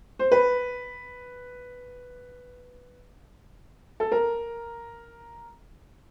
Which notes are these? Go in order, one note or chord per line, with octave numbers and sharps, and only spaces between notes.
C5
B4
A4
A#4